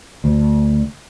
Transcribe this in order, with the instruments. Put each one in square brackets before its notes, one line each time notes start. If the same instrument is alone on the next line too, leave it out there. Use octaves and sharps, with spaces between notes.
[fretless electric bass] D2